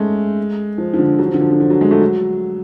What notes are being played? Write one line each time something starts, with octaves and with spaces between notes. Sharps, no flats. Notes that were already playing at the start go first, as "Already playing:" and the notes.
Already playing: G#3 A3 C#4
F3
F3
D3
F#3
F3
D3
F3
D3
F3
F#3
G#3
A3
F#3